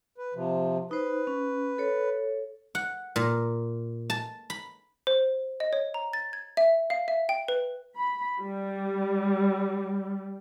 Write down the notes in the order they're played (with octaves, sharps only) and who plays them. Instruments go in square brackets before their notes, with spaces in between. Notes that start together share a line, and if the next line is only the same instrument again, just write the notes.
[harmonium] B4
C3 F3
[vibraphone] D#4 C5 [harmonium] B4
[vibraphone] C#4
A4 C#5
[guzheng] F#5
A#2
A5
B5
[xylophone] C5
D#5
C#5
A#5
A6
G#6
E5
F5
E5
G5
B4
[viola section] B5
G3